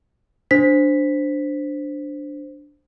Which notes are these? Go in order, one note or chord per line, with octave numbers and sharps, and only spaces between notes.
D4 C5 B6